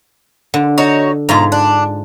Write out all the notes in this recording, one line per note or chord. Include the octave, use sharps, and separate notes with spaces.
D3
D#4 F#4 C#5
G#2 B2 F4 A#5
D4